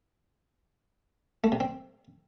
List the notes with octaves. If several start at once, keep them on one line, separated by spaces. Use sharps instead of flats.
A3
C3
C4